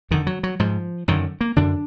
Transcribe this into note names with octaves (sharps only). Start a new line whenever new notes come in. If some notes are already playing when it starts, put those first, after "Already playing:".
F2 D3 D#3
F#3
F#3
G#2 F3
F#2 D3 D#3
A#3
F#2 D3 D4